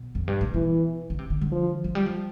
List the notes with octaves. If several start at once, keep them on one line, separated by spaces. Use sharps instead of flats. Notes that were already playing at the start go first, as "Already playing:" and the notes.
Already playing: B2
F2
G2
A2
B2 E3
D3
C3
D3
D3
F3
F3
G3
F3